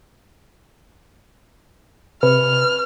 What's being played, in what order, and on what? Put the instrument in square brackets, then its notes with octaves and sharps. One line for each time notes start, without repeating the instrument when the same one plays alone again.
[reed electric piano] C3 [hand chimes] B4 [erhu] F6